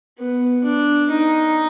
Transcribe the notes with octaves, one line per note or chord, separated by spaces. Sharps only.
B3
D4
D#4